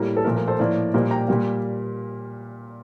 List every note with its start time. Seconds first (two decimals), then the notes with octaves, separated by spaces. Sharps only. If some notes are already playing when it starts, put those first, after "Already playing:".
Already playing: A2 G3 A#3
0.17 A4
0.24 A#2 F3 A3 A#4
0.36 A#4
0.48 A4 C5
0.59 A2 F3 A#3 A#4 D5
0.94 A#2 G3 A#3 C5 D#5
1.11 G5 A#5
1.28 A#2 G3 A#3